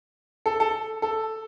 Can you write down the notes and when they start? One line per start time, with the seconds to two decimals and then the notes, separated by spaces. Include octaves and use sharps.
0.46 A4
0.60 A4
1.02 A4